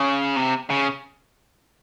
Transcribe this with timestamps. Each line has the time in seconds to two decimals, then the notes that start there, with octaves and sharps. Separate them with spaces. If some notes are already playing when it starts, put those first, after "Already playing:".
Already playing: C#3
0.36 C3
0.70 C#3